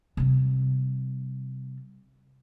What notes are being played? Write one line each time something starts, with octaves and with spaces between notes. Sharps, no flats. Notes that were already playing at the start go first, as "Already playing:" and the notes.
C3 G3